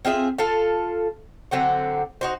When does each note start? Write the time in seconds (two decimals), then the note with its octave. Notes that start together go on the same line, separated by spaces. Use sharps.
0.05 C4 F4 G#4 E5
0.38 F4 A4 F5
1.51 D3 F#3 C4 F#5
2.21 D#4 F#4 C5